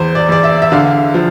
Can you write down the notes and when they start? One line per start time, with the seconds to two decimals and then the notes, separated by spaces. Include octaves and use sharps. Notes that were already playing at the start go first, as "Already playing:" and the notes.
Already playing: E2 C5
0.15 D5
0.29 E2 D5
0.44 E5
0.62 E5
0.72 D3 F5
1.14 F3